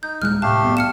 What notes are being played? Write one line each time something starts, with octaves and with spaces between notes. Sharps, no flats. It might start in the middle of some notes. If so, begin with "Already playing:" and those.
D#4 G6
D#1 G#3 F6 F#6
C2 A2 A3 G4 F5 A5
F#2 A2 B3
F6 C#7 E7